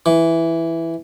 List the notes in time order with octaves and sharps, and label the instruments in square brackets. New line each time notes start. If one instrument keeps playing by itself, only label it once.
[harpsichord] E3